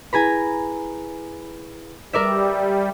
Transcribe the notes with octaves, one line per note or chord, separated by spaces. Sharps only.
E4 G#4 B4 G#5 A#5 B5
G3 A#4 D5 E5